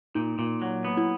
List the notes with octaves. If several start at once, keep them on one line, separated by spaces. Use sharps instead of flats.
A#2 D#4
A#2
F#3
B3
E4